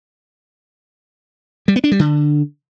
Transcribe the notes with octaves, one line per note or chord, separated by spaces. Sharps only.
G3
B3
D4
G3
D3